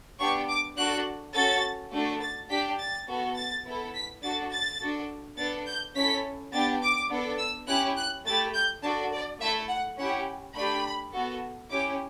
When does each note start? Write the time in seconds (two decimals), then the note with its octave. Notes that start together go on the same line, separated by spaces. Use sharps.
0.19 B3 D4 G4 C#6
0.48 D6
0.77 D4 F#4 A4 F#6
1.34 C#4 F#4 A4 A6
1.92 A3 D4 F#4 A4
2.21 A6
2.50 D4 G4 B6
2.79 A6
3.07 B3 F#4 A4
3.36 A6
3.65 B3 E4 A4
3.94 B6
4.22 D4 F#4 A4 A6
4.51 A6
4.80 D4 F#4 A4
5.37 B3 D4 A4 A6
5.67 G6
5.96 C#4 E4 A4 B6
6.53 B3 D4 G4 A6
6.82 D6
7.10 B3 D4 A4
7.38 E6
7.67 C#4 E4 G4 F#6
7.97 F#6
8.25 A3 E4 G4 A6
8.54 G6
8.82 D4 F#4 A4 A5
9.11 D5
9.40 A3 E4 A4 E5
9.68 F#5
9.98 C#4 E4 G4 F#5
10.55 A3 D4 G4 B5
11.12 B3 F#4 A4
11.70 C#4 E4 G4 D6